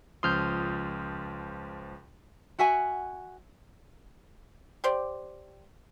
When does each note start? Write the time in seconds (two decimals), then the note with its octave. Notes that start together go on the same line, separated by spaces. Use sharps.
0.23 C#2 F3 C6 D#6 F6 G6
2.59 F#4 E5 F#5 G#5
4.84 G4 C5 D5